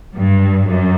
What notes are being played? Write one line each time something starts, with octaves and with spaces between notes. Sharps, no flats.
G2
F#2